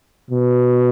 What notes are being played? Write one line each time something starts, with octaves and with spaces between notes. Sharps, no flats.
B2